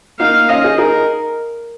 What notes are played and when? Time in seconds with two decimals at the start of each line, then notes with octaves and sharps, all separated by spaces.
0.20 A#3 D#4 F5
0.49 C#4 F4 D#5
0.64 D#4 G#4
0.78 D#4 G#4 A#4